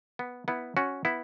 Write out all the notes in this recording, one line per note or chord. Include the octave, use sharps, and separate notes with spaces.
B3
B3 E4
C#4 F#4
B3 E4